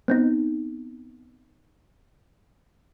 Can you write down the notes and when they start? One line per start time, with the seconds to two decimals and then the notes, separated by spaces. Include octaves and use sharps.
0.08 B3 C4 D#4